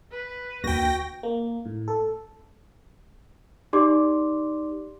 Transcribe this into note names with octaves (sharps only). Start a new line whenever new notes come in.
B4
D2 A#3 F#4 G5 A#6
A#3
A2
A4
D#4 G4 D5 C6 D6